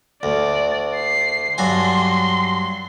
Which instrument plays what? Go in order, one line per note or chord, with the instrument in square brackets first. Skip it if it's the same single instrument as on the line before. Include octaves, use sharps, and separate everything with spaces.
[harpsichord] D2 [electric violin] D5
[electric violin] C7
[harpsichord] G2 F#3 G#5 [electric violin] C6